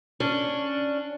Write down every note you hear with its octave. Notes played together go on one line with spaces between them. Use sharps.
C#4 D4